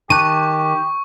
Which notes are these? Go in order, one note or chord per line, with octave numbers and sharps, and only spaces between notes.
D#3 G4 A5 C#6 F#6 D#7